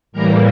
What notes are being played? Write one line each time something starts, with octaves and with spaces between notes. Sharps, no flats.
A2 E3 G3 A#3 A#4 A#5